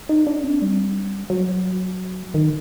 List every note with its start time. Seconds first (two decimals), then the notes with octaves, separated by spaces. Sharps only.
0.09 D#4
0.27 D4
0.44 C4
0.62 G3
1.30 F#3
2.34 D#3